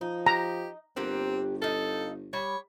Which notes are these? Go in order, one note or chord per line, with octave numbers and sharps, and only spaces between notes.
F3 D#4
G4 A#5
G1 A#3 C4 G4 F#5
D#4 A4 F5
G3 C#5